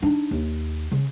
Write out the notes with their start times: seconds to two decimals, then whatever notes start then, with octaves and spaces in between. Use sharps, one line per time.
0.02 D4 D#4
0.31 D#2
0.92 C#3